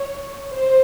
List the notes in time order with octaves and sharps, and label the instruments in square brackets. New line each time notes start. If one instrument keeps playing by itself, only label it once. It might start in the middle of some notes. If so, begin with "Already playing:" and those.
Already playing: [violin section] C#5
C5